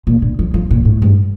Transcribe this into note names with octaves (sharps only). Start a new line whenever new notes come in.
A#2
D3
F3
F3
A#2
A2
G2